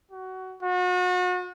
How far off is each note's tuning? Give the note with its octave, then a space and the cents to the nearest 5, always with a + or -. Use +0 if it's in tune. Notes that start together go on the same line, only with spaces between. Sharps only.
F#4 +20
F#4 -35